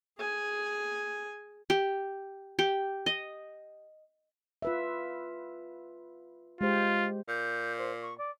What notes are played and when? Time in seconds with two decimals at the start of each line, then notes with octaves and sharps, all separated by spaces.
0.18 G#4 G#5
1.70 G4
2.59 G4
3.06 D#5
4.62 F4 B4 E5
6.61 G#3 F4 G4 C5
7.28 A#2 G6
7.78 C5
8.02 C#6
8.18 D5